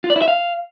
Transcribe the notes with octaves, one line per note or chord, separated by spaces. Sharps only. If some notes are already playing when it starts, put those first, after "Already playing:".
F4
D5
E4
E5
F5